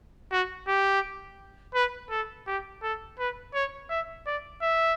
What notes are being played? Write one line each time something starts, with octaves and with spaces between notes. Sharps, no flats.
F#4
G4
B4
A4
G4
A4
B4
C#5
E5
D5
E5